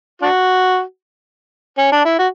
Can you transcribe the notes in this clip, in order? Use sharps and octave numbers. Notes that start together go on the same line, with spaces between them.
D4 F#4
C#4
D4
E4
F#4